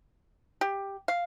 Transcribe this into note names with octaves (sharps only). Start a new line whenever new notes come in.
G4
F5